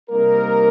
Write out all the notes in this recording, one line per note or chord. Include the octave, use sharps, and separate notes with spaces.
C3 G3 A#3 D#4 A#4